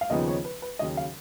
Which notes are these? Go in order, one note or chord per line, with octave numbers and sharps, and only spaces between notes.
F5
D#2 C#3 F3 B3 D#4 D#5
C#5
B4
B4
D#2 C#3 F#3 D#5
F5